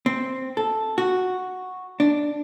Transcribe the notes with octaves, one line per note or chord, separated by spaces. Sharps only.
C4
A4
F#4
D4